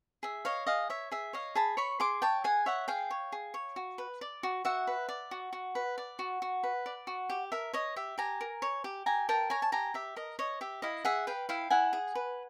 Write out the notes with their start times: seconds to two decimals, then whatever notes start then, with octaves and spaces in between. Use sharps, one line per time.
0.23 G#4 E5
0.45 C#5 D#5 F5
0.67 G#4 D#5 F5
0.90 C#5 E5
1.12 G#4 E5
1.33 C#5 D#5 F5
1.55 G#4 A5 B5
1.77 C#5 B5 C#6
2.00 G#4 C6 D6
2.22 C#5 G5 A5
2.44 G#4 F#5 G#5
2.66 C#5 E5 F#5
2.88 G#4 F5 G5
3.11 C#5
3.32 G#4
3.54 C#5
3.76 F#4
3.98 B4
4.21 D5
4.43 F#4
4.65 F#4 E5 F#5
4.87 B4
5.09 D5
5.31 F#4
5.53 F#4
5.75 B4
5.98 D5
6.19 F#4
6.42 F#4
6.63 B4
6.86 D5
7.07 F#4
7.30 G4
7.52 A#4 E5
7.73 C#5 D#5
7.96 G4 E5
8.18 G4 G#5 A#5
8.41 A#4
8.62 C#5
8.84 G4
9.06 G4 G#5 A#5
9.29 A#4 G5 A5
9.50 C#5 G#5 A#5
9.62 A5
9.72 G4 G#5 A#5
9.94 G4 E5
10.16 A#4 D#5
10.39 C#5 D#5
10.61 G4 E5
10.82 E4 D#5 F5
11.05 G#4 E5 F#5
11.27 B4 F5 G5
11.49 E4 F5 G5
11.70 E4 F#5 G#5
11.93 G#4
12.15 B4